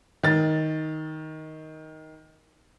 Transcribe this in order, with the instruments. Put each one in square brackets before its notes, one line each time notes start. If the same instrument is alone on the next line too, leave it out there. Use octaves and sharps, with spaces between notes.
[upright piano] D#3 A6